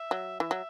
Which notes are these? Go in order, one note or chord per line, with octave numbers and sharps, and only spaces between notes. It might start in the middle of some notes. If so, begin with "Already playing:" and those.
Already playing: E5
F#3
E3 E5
F#3